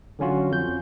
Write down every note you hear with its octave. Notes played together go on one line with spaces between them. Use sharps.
D3 F#3 C#4 F4 F#4
F2 G6